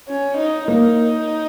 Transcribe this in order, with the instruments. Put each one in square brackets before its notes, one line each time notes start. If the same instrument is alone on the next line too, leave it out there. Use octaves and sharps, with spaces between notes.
[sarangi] C#4
D#4
[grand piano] A#3 [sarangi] D#4